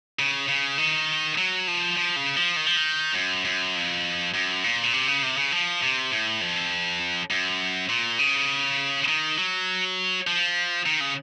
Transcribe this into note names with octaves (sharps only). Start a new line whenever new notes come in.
C#3
C#3
D#3
F#3
F3
F3
C#3
F3
D#3
F3
D#3
F#2
F#2
F2
F#2
A#2
A#2
C3
C#3
C3
C#3
F3
C3
A2
F2
F#2
A#2
C#3
D#3
F#3
F3
D#3
C#3